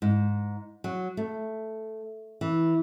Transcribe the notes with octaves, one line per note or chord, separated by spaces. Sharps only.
G#2
F#3
A3
E3